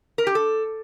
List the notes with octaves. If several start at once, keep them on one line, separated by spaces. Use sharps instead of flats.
A#4
G4
A4